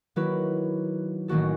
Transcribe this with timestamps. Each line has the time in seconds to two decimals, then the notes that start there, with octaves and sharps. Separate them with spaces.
0.16 D#3 F#3 A#3 E4 F#4 B4
1.28 A1 D#3 A#3 F#4 A4